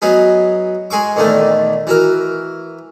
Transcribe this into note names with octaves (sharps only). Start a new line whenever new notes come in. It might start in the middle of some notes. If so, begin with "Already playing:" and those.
F#3 B3 D#4 G#4
G#3 G#4 C#6 D6
E2 A#2 D#3 A3 D#4
E3 F#4 A#4